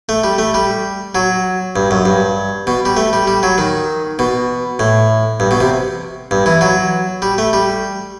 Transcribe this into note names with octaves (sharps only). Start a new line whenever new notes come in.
A3
G3
A3
G3
F#3
G2
F#2
G2
B2
G3
A3
G3
G3
F#3
D#3
B2
A2
G2
B2
C3
G2
E3
F#3
G3
A3
G3